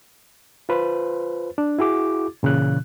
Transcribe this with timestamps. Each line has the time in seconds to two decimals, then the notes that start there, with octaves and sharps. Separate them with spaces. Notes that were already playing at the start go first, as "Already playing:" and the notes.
0.69 F4 B4 C5
1.58 D4
1.79 E4 F#4 G#4 D6
2.43 A#2 C#3 E3 F#6